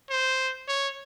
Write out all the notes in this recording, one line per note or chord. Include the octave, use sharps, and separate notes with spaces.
C5
C#5